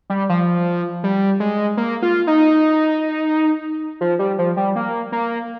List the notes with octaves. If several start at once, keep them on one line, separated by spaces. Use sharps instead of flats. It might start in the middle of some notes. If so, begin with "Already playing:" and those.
G3
F3
G3
G#3
A#3
F4
D#4
F3
G3
F3
G3
A#3
A#3